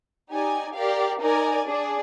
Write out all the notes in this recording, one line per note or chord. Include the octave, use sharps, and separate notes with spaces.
D#4 G4 D5 G#5
G4 A#4 D5 F5
D#4 A#4 D5 G#5
D4 G#4 D5